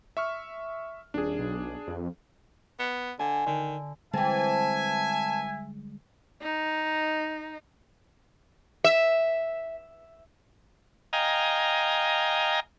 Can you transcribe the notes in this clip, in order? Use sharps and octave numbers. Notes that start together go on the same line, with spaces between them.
E5 C#6 F6
D#1 D4 G#4
B1
F2
B3
D3 G#5
D3 D#3
D3 E3 G3 G#3 C4 E5 G#5 A5
D#4
E5
D#5 F5 G5 G#5 A#5